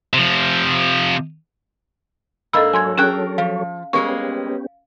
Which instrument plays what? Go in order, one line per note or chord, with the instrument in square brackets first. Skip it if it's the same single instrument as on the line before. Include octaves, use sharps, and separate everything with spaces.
[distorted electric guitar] C3 F3
[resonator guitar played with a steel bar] G#2 A#3 D4 [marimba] A4 D#5 B5 [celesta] E6
[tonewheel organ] F#3 A4 C#5 [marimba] G#5 C6 G#6
[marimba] C#4 G#4 F#6 [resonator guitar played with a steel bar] D4 A#4 G5
[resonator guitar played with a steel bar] F3 [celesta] F5
[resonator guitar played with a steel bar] G3 G#3 A#3 [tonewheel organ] B3 C#4 G4 [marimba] C#6